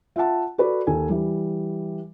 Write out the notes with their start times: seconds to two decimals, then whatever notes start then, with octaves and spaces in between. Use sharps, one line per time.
0.16 F4 E5 F#5 A5
0.58 F#4 A4 B4 D5
0.87 D#2 A4 G#5
1.09 E3 G3